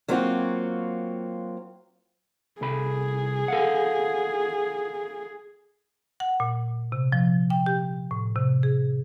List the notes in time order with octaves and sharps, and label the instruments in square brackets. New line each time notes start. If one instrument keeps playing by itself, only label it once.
[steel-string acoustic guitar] F#3 A#3 C4 F4 F#4
[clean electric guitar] C2 A4 B5 [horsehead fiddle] G#4
[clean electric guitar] A4 F5 F#5
[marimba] F#5
A#2
C3
F3
G5
G4
A2
C3
G#4